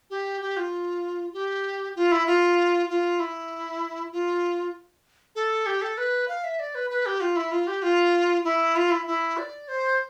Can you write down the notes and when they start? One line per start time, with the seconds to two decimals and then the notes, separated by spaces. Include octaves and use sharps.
0.10 G4
0.42 G4
0.57 F4
1.33 G4
1.96 F4
2.12 E4
2.27 F4
2.89 F4
3.20 E4
4.12 F4
5.35 A4
5.66 G4
5.82 A4
5.98 B4
6.28 F5
6.44 E5
6.59 D5
6.75 B4
6.90 B4
7.06 G4
7.21 F4
7.36 E4
7.52 F4
7.67 G4
7.82 F4
8.44 E4
8.76 F4
8.91 E4
9.07 E4
9.38 D5
9.68 C5